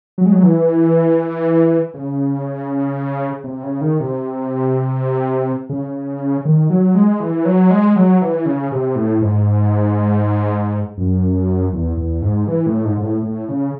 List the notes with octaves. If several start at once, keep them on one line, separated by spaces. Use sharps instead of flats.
F#3
G#3
F#3
E3
C#3
C3
C#3
D#3
C3
C#3
D#3
F#3
G#3
E3
F#3
G#3
F#3
E3
C#3
C3
A2
G#2
F#2
E2
E2
G#2
E3
A2
G#2
G#2
A2
A2
C#3